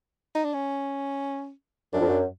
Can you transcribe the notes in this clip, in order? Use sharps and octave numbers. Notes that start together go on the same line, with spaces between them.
D#4
D4
C#4
F#2 D4
F2
F#2